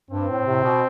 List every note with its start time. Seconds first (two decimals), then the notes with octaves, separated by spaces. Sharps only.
0.11 G2 C4
0.29 A2
0.46 A2 C3
0.64 B2